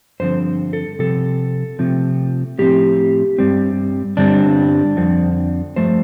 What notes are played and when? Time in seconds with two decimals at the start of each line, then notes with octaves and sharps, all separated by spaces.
0.20 G2 D3 F3 C4 C5
0.73 A4
0.99 C3 F3 C4 A4
1.79 C3 F3 A3 C4
2.58 A2 F3 C4 G4
3.38 G2 G3 C4
4.17 G2 D3 G3 C4 D4
4.97 F2 D3 F3 C4
5.76 G2 F3 A3 C5